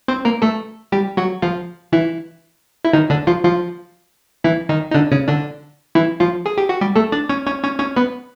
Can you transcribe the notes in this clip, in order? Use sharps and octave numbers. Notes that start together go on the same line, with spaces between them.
C4 C5
A#3 A#4
A3 A4
G3 G4
F#3 F#4
F3 F4
E3 E4
E4
D#3 D#4
D3 D4
F3 F4
F3 F4
E3 E4
D#3 D#4
D#4
D3 D4
C#3 C#4
D3 D4
E3 E4
F3 F4
G#4
G4
F#4
G3 G4
A3 A4
D4 D5
C#4 C#5
C#4 C#5
C#4 C#5
C#4 C#5
B3 B4